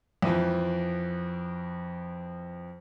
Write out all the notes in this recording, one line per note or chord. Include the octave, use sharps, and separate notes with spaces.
F2 E3 F3